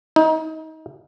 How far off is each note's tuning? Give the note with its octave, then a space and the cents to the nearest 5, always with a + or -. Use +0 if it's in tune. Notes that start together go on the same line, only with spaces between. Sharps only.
D#4 +30